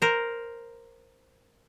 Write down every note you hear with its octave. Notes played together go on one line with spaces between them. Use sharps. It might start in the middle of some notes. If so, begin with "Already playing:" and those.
A#4 C5